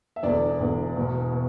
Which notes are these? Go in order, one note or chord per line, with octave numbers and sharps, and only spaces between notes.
E5
E1 E2 D3 D4 D5
E1 E2 D3
E1 E2 B2
B2